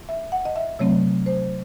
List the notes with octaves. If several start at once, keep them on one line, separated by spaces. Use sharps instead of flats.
E5
F#5
D#5
E5
C3 F#3 A3 C4 C#5
C5